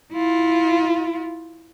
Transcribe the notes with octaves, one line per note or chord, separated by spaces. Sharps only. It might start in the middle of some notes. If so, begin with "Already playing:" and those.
E4 F4